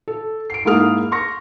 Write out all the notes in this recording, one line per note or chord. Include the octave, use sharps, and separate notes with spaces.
A4
C7 D7
G#2 A#3 E4 G#4 D#6 F6
C6 C#6 A#6